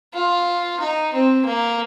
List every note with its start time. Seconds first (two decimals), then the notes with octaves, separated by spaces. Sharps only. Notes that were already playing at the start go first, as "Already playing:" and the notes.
0.14 F4
0.80 D#4
1.13 C4
1.45 A#3